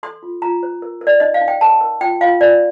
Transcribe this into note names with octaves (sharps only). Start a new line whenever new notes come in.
A4 C6
F4
F4 A#5
C5
A#4
A#4
D5
D#4 D#5
F5
D#4
G5
A#4 A5
A#4
F4 G5
F4 F5
F4 D5